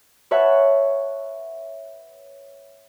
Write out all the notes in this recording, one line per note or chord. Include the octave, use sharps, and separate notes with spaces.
B4 C#5 E5 F#5 A5